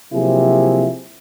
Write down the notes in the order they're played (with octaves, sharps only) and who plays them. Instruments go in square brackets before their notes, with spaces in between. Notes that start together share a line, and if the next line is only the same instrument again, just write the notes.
[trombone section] C3 F3 F#3 A#3 E4 G#4